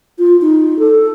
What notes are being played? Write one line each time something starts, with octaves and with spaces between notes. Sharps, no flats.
F4
D#4
A4